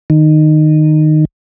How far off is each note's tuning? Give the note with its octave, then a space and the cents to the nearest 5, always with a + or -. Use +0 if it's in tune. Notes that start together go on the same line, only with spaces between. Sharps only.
D#3 -15